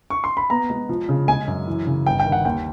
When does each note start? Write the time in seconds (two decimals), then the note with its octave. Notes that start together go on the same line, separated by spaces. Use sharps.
0.10 C#6
0.24 C6
0.37 B5
0.50 B3 A#5
0.70 G#3
0.89 F3
1.09 C#3
1.28 G#3 G#5
1.48 F#2
1.67 E3
1.86 C#3
2.06 G1 G5
2.20 G5
2.25 D#3
2.32 F#5
2.45 D#2 G5